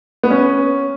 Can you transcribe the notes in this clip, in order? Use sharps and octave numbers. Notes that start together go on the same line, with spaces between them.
B3
C#4